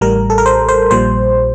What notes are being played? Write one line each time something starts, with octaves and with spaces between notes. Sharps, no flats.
A1 A2 G3 A#4
A4
A#4
C5
C5
A#1 A#2 G3 C5